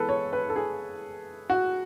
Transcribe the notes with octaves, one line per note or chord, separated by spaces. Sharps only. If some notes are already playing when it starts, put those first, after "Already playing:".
Already playing: E3 G#3 B3 A4 B4
C#5
B4
A4
G#4
F#4